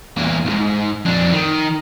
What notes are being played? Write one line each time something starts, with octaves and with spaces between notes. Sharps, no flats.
E2 A#3
B1 G#2
F2 D4
D#3